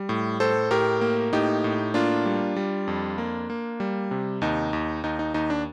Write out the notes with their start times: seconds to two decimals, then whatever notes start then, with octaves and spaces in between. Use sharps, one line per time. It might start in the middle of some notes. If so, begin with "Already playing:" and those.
Already playing: G3
0.09 A2
0.40 A2 A4 C5
0.71 A2 G4 A#4
1.01 A#3
1.33 A2 D#4 G4
1.64 A2
1.94 A#3 D4 F4
2.26 G3
2.56 G3
2.88 F2
3.18 A#3
3.50 A#3
3.80 G3
4.11 C3
4.42 D#2 D#4
4.73 D#2
5.04 D#2 D#4
5.19 D#4
5.34 D#2 D#4
5.50 D4